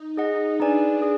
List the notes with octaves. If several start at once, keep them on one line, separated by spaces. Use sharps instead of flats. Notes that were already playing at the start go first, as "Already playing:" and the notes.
Already playing: D#4
G#4 D#5 F#5
D4 D#4 G#4 B4 D5 G#5
G#4 D5 G#5